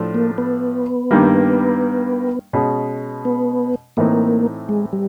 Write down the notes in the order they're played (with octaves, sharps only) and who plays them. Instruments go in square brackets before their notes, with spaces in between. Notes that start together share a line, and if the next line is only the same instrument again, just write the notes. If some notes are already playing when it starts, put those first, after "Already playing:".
Already playing: [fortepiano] A2 F3 A3 D4
[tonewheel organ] A#3
B3
[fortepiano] G2 D#3 G3 A#3
B2 G#3 C#4
[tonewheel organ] B3
[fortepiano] A2 E3 A3 C4 D#4 [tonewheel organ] A#3
[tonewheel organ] G#3
G3